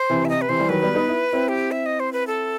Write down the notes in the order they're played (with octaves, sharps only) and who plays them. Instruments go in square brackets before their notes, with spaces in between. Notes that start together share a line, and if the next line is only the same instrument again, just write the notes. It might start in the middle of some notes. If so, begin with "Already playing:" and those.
Already playing: [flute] C5
[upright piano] C3 E3
[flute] E5
[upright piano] C3 [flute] D#5
[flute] B4
[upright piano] C3 E3 [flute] C5
[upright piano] E3 G3
[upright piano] D#3 F#3 [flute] B4
[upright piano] G3 B3
B3 D#4
E4
C4 E4
[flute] G4
E5
D#5
C5
B4
A4